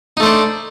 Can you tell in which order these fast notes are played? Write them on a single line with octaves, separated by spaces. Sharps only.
D#4 A3 C5 D4